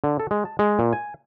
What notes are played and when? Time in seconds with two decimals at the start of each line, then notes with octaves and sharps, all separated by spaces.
0.04 D3
0.20 A4
0.31 G#3
0.45 A5
0.59 G#3
0.79 A#2
0.93 G#5